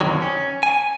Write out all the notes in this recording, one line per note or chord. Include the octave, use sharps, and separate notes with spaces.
F2 B2 D3 D#3 F#3
C#4
G#5